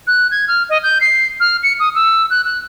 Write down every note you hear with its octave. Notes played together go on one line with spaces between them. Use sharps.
F#6
G#6
F6
D#5
G6
C7
F6
C#7
D#6
E6
F#6
F#6